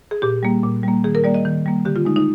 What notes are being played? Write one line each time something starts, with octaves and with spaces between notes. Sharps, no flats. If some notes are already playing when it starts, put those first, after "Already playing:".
G#4
A#2 G4
G3 A#3
A#2
G3 A#3
D#3 G#4
A#4
G3 A#3 D5
D#5
D#3
G3 A#3
D3 G4
F4
G#3 D#4
D#4